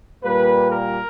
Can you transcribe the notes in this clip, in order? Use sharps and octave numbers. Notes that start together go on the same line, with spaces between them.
A#2 G3 A#3 B4
A#4